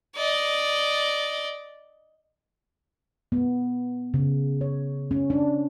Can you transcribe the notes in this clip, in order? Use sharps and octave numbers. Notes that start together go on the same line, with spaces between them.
D5 D#5
B3
C#3
C#5
C#4
D4